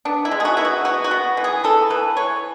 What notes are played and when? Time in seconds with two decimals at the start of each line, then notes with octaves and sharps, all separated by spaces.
0.05 B3 D4
0.25 E4
0.31 G#3
0.40 G#4
0.45 F#4
0.57 B3 E4
0.65 F#4
0.85 B3 F#4
1.04 F#4
1.11 B3
1.37 E3
1.44 G#4
1.64 B3 A4
1.90 E3 B4
2.16 E3 C#5